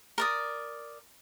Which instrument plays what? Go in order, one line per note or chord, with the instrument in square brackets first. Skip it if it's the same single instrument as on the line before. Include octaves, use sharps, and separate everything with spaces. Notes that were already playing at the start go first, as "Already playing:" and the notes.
[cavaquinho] A#4 D5 D#6